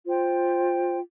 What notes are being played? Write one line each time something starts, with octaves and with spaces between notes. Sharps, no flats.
F4 C5 G5